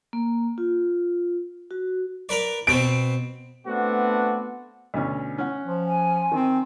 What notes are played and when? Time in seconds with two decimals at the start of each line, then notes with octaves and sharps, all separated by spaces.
0.13 A#3
0.58 F4
1.71 F#4
2.29 A#4 B4 D5
2.67 B2 B3 C4 D7
3.67 A3 B3 C4 D4 F#4
4.94 D2 B2 C#4
5.38 C#4 F#5
5.64 F3
5.87 G#5
6.32 D#3 C4